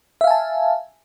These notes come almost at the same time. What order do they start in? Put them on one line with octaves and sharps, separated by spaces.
E5 F5 G#5 A5